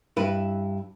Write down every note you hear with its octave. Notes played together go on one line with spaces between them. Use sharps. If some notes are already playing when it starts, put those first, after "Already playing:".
G2 E4 B4